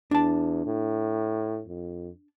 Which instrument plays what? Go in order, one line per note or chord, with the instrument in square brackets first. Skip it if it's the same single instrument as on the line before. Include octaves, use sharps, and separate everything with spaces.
[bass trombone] E2 [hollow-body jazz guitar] D4 A5
[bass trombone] A2
F2